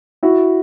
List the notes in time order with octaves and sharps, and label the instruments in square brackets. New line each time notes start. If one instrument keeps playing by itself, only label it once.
[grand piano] E4 F#4